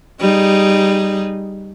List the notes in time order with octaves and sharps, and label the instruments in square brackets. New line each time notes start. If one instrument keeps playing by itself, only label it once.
[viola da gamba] G3 D#4 G#4